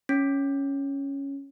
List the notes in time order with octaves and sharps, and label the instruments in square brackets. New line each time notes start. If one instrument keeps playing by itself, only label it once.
[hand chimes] C#4